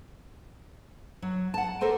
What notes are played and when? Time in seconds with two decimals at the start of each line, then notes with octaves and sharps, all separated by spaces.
1.22 F#3
1.54 F#5 A5
1.81 G4 A4 A#4 C5 G#5